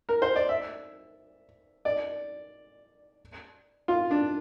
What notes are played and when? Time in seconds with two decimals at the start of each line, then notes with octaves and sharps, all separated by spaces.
0.09 A#4
0.22 C5
0.36 D5
0.49 E5
1.85 D5
3.88 F4
4.11 D4